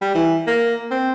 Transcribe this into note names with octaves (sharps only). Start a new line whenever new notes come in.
G3
E3
A#3
C4